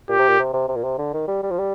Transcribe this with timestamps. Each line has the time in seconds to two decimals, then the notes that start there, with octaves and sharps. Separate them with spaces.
0.09 A#2 G4
0.18 C3
0.29 A#2
0.39 C3
0.53 C3
0.69 C3
0.76 A#2
0.84 C3
0.98 D3
1.14 D#3
1.28 G3
1.43 G3
1.51 F3
1.59 G3